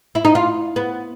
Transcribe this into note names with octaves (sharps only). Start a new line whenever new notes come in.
E4
D#4
F4
B3